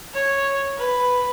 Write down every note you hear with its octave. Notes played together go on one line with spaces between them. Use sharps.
C#5
B4